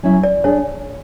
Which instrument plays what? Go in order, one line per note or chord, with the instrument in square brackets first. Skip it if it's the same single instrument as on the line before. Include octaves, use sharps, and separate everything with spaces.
[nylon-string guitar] F#3 C#4 E4
[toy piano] D5
[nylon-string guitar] D4 G#4 [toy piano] C#5